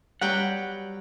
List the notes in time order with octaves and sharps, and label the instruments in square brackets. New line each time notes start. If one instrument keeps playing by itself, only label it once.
[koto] F#3 B4 G5 [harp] G3 [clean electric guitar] F#5